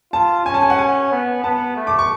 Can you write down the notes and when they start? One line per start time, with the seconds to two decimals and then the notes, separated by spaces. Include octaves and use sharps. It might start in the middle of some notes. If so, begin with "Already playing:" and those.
0.13 F4 A5
0.46 C#4 G#5
0.54 A5
0.62 G#5
0.70 F#5
0.79 G#5
1.12 B3
1.43 B3 A5
1.76 A3
1.87 D6
1.99 C#6